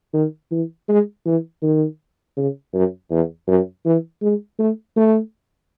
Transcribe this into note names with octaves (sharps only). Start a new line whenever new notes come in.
D#3
E3
G#3
E3
D#3
C#3
F#2
E2
F#2
E3
G#3
A3
A3